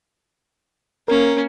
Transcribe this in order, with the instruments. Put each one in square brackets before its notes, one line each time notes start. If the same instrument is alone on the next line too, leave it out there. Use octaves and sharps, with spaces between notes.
[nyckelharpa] A#3 C#4 [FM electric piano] A#4